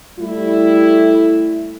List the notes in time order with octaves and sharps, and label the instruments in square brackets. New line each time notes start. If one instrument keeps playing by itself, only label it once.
[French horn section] G3 A3 E4